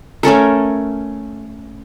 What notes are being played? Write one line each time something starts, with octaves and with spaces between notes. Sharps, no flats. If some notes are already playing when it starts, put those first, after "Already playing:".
A3 C#4 A4 A#4